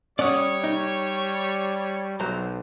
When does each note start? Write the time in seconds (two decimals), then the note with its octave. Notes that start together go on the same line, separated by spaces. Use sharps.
0.19 G3 C#4 C#5 D5 F#5 D#6
0.64 D#4
2.20 B1 F#3 C5 A#5